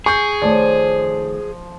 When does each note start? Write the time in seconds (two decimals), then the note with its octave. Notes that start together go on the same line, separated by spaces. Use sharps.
0.06 G#4 C#6 G6
0.42 D#3 F3 A3 C#5 D5